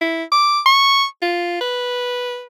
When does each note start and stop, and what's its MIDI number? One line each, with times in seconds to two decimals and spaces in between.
0.01 0.23 64
0.32 0.60 86
0.66 1.05 85
1.22 1.61 65
1.61 2.45 71